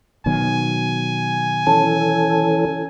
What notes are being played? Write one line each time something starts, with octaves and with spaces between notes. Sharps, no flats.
B2 D#3 F#3 G#5
E3 C#4 A4 A5